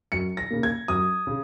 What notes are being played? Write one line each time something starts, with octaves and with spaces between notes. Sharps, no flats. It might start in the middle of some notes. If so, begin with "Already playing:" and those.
F#2 C#7
A#6
C#3 A#3
G#6
F#2 D#6
C#3